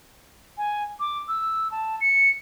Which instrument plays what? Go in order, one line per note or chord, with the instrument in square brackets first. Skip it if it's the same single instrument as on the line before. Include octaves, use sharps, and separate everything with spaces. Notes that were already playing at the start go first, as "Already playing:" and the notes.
[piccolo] G#5
D6
E6
A5
C#7